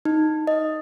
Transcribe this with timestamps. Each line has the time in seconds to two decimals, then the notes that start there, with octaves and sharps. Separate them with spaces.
0.05 D#4
0.47 D#5